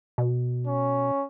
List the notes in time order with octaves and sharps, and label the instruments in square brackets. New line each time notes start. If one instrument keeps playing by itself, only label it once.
[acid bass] B2
[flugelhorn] C#4